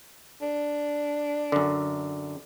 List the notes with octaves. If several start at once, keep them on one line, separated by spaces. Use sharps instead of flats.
D4
F#2 D3